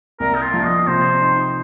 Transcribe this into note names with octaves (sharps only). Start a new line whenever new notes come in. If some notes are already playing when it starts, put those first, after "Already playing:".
C2 A#4
D#4
F4
F3
D#5
C3 C5
D#4